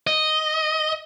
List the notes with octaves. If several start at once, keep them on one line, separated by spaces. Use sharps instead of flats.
D#5